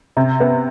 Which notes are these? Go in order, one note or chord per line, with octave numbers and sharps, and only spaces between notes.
C3
B3